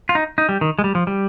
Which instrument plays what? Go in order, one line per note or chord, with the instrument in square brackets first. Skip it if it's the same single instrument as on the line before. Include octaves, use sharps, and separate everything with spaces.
[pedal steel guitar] F4
D#4
D#4
G3
D#3
G#3
G3
F3
G3